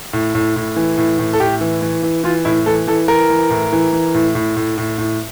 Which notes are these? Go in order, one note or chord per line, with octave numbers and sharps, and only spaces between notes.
A2
A2
A2
E3
A2
A2
A4
A2 G4
E3
E3
E3
E3 F4
A2 E4
E3 A4
E3 A4
E3 A#4
E3
A2
E3
E3
A2
A2
A2
A2
A2